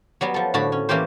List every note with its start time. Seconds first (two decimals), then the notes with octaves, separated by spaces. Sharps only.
0.21 F#3 G3 B3
0.34 F3 A4
0.54 A2 D3 F#4 A5 B5
0.72 C#4
0.89 E3 A#3 C#4 G4 C5